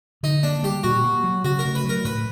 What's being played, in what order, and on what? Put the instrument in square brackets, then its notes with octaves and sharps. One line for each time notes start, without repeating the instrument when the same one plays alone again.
[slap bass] D3 [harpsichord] D#4
[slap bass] A#3 [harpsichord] D4
[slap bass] G3 [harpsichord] G4
[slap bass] A#2 [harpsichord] F#4
[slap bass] A#3
F#3
[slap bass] C#3 [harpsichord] F#4
[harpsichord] A#4
[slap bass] A3
[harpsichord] B4
[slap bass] F#3
[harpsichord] A#4
[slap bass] A2 [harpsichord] B4